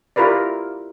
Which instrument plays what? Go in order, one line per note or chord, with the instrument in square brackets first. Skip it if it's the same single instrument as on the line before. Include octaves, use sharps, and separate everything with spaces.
[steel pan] E4 F4 G4 A#4 B4 D5